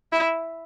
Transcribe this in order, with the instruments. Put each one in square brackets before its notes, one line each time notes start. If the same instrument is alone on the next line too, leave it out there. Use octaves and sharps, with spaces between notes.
[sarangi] E4